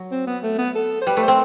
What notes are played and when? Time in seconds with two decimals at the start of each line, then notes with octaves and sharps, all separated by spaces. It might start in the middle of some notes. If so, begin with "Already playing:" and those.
Already playing: F#3
0.12 C4
0.27 B3
0.43 A3
0.59 B3
0.75 A4
1.02 C5
1.07 G3 B4
1.17 A3
1.23 C5
1.28 C4